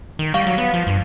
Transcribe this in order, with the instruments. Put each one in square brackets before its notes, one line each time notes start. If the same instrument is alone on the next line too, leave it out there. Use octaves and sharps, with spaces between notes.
[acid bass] D#3
[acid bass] G3 [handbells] F5 C#6
[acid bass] F#3
B3
F3
G2